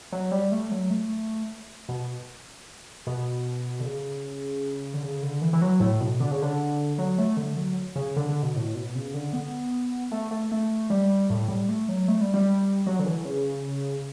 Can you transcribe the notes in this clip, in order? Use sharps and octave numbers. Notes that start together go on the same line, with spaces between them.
F#3
G3
A3
F#3
A3
B2
B2
D3
C#3
D3
C#3
D3
E3
E3
F#3
A2
B2
D3
C#3
D3
F#3
A3
D3
F#3
C#3
D3
D3
B2
A2
B2
C#3
D3
B3
A3
A3
A3
G3
A2
G3
A3
F#3
A3
G3
G3
F#3
D3
E3
C#3